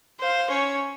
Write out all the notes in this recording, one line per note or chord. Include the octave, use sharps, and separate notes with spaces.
C5 F5
C#4 C#5